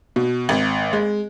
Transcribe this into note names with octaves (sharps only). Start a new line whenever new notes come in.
B2
G#1
G#3